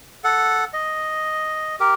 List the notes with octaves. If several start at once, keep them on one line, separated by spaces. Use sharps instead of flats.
A4 F#5
D#5
G4 A#4